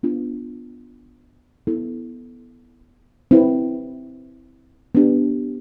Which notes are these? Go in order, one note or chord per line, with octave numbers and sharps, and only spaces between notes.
B3 D4 F4
B3 E4 A4
C4 E4 B4
B3 D4 G4